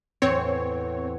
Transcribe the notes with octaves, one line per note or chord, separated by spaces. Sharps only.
E2 A2 C4 C#5